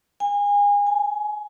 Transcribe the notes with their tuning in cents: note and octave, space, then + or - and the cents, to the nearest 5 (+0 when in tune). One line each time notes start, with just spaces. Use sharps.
G#5 -30
G#5 +20